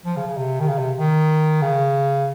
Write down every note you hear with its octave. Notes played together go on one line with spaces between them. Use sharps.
F3
C#3
C#3
C3
D#3
C#3
C3
D#3
C#3